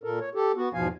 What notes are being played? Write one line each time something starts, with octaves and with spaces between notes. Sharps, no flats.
A#2 A4 A#4
C#5
G4 A4
B3 F#4
E2 G#2 B2 F3 F5 G#5